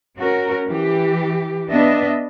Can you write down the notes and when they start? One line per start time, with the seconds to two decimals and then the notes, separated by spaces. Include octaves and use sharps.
0.18 C#4 F#4 A#4
0.68 E3 G4
1.70 B3 D4 D#5 E5